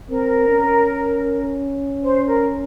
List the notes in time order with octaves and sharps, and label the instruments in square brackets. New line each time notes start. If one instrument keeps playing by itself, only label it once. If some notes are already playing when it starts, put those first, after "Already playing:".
[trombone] C4 [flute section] A#4
[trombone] C#4
[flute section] C5
A#4